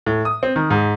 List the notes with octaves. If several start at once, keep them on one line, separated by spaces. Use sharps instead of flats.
A2
D#6
C4
D#3
G#2